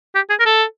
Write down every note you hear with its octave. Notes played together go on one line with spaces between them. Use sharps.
G4
G#4
A#4
A4